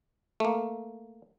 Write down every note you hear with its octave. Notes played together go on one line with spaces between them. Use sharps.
A3 A#3